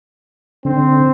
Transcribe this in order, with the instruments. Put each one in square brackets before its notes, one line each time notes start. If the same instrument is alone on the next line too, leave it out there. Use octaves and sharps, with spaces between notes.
[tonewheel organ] D3 [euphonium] C4